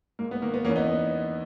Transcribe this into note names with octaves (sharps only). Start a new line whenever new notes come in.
G#2 A#3
B3
D#3 A#3
B3
E2 A#3 C#4
B3 D#4